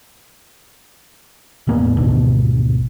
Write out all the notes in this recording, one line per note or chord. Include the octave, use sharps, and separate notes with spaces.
E1 A2 A#3 B3
G#1 D2 B2